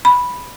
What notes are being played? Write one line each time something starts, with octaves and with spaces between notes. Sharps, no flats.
B5